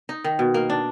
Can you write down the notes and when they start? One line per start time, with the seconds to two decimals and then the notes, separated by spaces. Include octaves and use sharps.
0.09 D#4
0.24 D#3
0.39 B2
0.54 A#3
0.70 D4